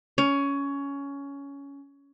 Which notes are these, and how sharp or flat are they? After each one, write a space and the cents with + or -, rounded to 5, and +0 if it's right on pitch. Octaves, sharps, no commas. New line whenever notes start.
C#4 +15